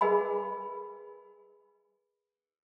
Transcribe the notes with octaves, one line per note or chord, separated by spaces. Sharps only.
G#4 A#4 B4 D#5 G#5 B5